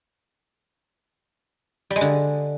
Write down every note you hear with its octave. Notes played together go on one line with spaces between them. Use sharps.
G3
G#3
D3